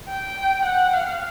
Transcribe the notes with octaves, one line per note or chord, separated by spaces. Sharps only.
G5
F#5
F5